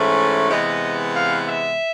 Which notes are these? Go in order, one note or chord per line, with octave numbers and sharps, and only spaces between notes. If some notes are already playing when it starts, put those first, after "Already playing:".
Already playing: G#2 E3 A3 C#4
C3 E3 G#3 B3 D#5
F5
E5